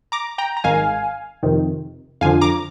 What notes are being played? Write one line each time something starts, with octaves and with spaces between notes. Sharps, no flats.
A#5 D6
G5 A#5
A#5
G#1 G#2 D#3 F5 G#5
F2 C3 D#3
F2 D3 F3 F5 G#5
A#5 D6